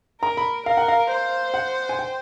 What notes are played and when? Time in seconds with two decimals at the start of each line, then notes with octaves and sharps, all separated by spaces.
0.22 A#4 A#5
0.37 B5
0.66 A#4 F5
0.77 F#5
0.88 F5
1.10 C5
1.54 F#5
1.89 G#5
1.99 G5